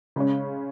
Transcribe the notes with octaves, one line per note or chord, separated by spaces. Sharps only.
C#3 G#3 C#4